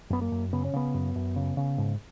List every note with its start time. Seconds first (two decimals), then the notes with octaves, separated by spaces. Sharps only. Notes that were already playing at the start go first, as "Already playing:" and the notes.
0.10 F#2 B3
0.21 A#3
0.32 F#2
0.53 C#3 B3
0.65 C#4
0.73 C#3 B3
0.94 F#2
1.16 F#2
1.36 C#3
1.57 C#3
1.78 G#2